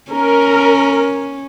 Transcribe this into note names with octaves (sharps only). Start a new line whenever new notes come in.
C#4 A#4